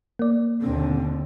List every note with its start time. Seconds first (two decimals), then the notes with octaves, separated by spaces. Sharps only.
0.19 A#3 D5
0.62 D#2 B2 D3 C4